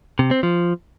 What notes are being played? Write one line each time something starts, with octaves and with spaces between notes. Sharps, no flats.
C3
C4
F3